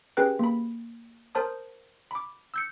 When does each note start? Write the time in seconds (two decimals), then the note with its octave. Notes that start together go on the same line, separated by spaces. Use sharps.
0.17 C#4 G4 G#4 B4 G5 F#6
0.39 A#3 B5
1.35 A#4 C5 A5 D#6
2.11 B5 D6
2.54 E6 G6 C#7